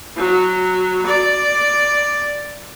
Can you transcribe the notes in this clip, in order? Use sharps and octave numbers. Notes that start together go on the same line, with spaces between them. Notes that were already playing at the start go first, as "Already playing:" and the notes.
F#3
D5